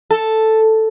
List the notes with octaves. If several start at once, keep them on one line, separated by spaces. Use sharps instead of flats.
A4